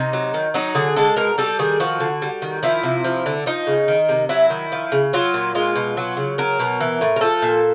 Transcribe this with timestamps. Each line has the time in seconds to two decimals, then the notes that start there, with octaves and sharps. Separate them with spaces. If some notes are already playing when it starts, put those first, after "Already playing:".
Already playing: C3 D#4
0.13 F#3
0.34 D#3
0.54 F#3 D#4
0.75 D3 G#4
0.96 G#3 A4
1.17 B2 A#4
1.38 G3 A4
1.59 D#3 G#4
1.80 F3 F#4
2.00 D3
2.22 G3
2.42 D#3
2.63 F3 E4
2.83 C3
3.04 F3
3.26 D3
3.46 F3 D#4
3.67 C#3
3.88 D#3
4.09 C3
4.29 F#3 E4
4.50 D#3
4.72 F3
4.92 C#3
5.13 F#3 F4
5.34 A#2
5.55 G#3 F4
5.76 B2
5.97 F#3
6.17 C#3
6.38 F#3 A#4
6.60 B2
6.80 E3
7.01 A2
7.16 A#4
7.21 F3 A4
7.42 A#2